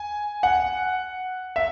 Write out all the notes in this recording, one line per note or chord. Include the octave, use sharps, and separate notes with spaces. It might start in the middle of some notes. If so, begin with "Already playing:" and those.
Already playing: G#5
F#5
E5